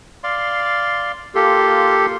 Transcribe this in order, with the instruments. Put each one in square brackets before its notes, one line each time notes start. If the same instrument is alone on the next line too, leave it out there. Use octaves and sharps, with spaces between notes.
[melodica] D5 F5 C6
[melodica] A#3 F4 C6 [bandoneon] G4 A4